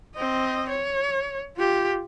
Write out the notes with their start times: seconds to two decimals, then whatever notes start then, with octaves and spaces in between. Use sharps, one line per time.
0.16 C4 D#5
0.70 C#5
1.57 F4 G4